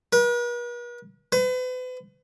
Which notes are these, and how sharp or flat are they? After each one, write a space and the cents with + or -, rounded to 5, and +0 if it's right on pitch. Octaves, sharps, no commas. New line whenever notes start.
B4 -45
B4 +40